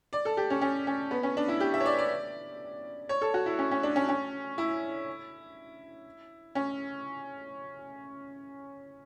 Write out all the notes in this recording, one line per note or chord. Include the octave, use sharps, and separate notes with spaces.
D5
A4
G4
C#4
C#4
C#4
B3
C#4
D4
E4
G4
E5
C#5
D5
D5
C#5
A4
F#4
E4
C#4
C#4
D4
C#4
C#4
E4
C#4